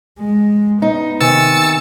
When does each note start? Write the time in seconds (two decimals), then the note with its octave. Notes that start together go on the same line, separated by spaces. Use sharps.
0.19 G#3
0.82 B3 D#4
1.20 C3 D#3 G#5 E6 A6 C#7